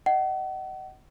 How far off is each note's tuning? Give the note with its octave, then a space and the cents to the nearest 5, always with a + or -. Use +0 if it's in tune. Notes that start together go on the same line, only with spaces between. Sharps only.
D#5 +0 F#5 +35